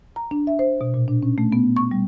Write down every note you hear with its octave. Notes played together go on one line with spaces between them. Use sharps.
A#5
D4
E5
C5
B2
A#2
D4
C#4
A3
B3
C#6
G3